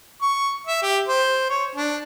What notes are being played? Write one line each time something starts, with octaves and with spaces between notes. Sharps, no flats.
C#6
E5
G4
C5
C#5
D4